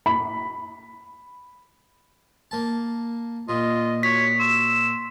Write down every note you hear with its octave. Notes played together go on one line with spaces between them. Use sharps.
B5
A#3 A5
A#2 F4 D#5
F#4 C#5 B6
C6 E6